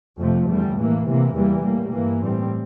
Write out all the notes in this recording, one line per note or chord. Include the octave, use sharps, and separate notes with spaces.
F2 C3 F3 A3
E2 D3 G3
A2 E3 A#3
C3 E3 A#3
E2 E3 G3 A#3
A2 G3 A#3
G2 E3 A#3
A2 G3 C4